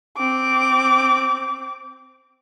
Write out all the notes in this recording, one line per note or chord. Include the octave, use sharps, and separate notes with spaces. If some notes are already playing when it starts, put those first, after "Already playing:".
C4 D6